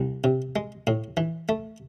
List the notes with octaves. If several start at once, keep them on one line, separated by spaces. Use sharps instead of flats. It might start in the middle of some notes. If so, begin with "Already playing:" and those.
Already playing: C2
C3
G#3
A2
E3
A3